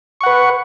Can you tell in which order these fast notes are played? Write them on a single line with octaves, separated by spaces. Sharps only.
C#6 F#5 B4